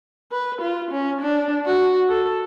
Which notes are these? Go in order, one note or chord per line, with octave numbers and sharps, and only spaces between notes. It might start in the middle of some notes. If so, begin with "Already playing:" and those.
B4
F4
C#4
D4
F#4
A4